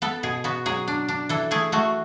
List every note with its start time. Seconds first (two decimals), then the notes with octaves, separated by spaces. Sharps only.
0.02 B3 A4
0.23 B2 G#4
0.44 B3 F#4
0.66 F#3 G#4
0.88 D4
1.08 D4
1.29 E3 A4
1.51 A3 G#4
1.72 A3 F#4